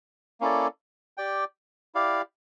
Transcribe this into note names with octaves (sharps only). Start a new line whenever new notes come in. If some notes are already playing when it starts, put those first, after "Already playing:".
A#3 C#4 E4 A4 D5
G4 D5 G5
E4 G4 D5 F5